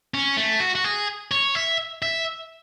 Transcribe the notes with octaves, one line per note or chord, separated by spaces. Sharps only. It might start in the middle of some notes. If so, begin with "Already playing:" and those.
C#4
A3
F#4
F#4
G#4
C#5
E5
E5